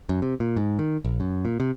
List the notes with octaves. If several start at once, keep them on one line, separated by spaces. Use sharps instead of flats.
F#2
C3
A#2
G#2
D#3
A#1
F#2
A#2
C3